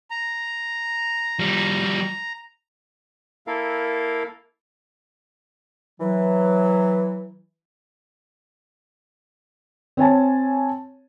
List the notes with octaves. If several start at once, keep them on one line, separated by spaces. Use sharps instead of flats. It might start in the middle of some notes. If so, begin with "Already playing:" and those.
A#5
F3 G3
A#3 E4 A4 A#4 F5
E3 F#3
C4 C#5 G#5 A5